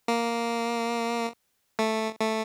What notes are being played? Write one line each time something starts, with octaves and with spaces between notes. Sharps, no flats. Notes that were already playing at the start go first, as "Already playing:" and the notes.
A#3
A3
A3